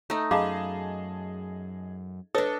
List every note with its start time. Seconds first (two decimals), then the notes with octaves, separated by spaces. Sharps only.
0.10 A3 D#4
0.31 F#2 G#4 D#5 F5 A5 B5 D6
2.35 D4 A4 B4 C#5 D#5 D#6